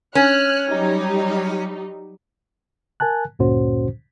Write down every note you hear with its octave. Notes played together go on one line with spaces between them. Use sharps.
C#4 F6 F#6
F#3 G3 D#4
A#4 G#5 A5 F#6
D2 G2 A#2 C#4 F#4 C5